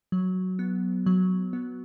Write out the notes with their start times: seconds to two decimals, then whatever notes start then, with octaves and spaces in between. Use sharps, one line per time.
0.12 F#3
0.59 B3
1.06 F#3
1.53 B3